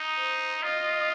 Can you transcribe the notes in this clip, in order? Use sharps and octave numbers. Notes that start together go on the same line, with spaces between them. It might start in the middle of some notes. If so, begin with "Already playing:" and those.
Already playing: D#4
C5
F4 D#5